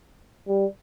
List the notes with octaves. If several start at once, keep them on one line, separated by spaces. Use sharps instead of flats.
G3